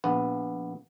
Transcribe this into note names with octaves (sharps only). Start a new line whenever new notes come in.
A#1 B3